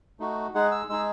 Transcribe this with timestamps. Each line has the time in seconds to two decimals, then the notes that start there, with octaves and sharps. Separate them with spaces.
0.20 A3 D#4 F#4
0.54 G#3 D#4 G#4 F#5
0.72 E6
0.89 G#3 D#4 G#4 E6